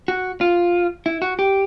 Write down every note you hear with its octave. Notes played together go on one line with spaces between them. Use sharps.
F#4
F4
E4
F#4
G4